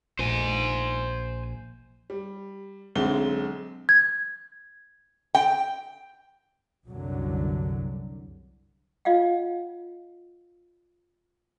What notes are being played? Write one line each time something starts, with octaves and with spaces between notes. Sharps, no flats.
A#1 C5 G#5
G3
B1 D3 G#3 C4 E5 G7
G#6
G5
C2 F#2 D3 F#3
F4 D#5 F5 F#5